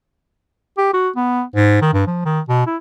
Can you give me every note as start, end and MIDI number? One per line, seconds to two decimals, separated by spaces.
0.78 0.89 67
0.93 1.09 66
1.16 1.43 59
1.55 1.80 44
1.82 1.90 51
1.93 2.03 43
2.07 2.21 53
2.25 2.41 51
2.48 2.66 47
2.67 2.76 64